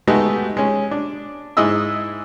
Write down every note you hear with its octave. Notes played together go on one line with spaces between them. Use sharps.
G#3 A3 B3 D#4 F#4 G4
G#3 C#4
D4
G#2 E4 G#4 D#5 E6